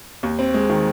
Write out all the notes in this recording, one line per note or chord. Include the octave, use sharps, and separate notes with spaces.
D#2
C4
G#3
D#3